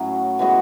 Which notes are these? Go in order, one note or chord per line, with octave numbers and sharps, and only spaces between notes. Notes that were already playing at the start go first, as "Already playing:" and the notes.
Already playing: A2 F#3 C#4
E3 G#3 B3 F#4